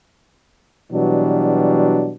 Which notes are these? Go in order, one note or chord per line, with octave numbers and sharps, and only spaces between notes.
B2 E3 F#3 G3 D4